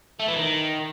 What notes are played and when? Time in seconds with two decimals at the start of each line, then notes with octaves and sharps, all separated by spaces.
0.20 A3
0.28 E3
0.36 D#3